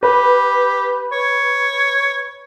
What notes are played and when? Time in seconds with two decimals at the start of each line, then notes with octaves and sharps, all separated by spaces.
0.03 G4 B4
1.12 C#5